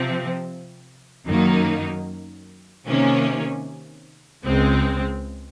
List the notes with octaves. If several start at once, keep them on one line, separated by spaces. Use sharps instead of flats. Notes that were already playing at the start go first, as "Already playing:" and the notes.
Already playing: C3 F3 C4
F#2 D#3 F#3 A#3 D#4
C3 D#3 A#3 C#4
C#2 C#3 G#3 C4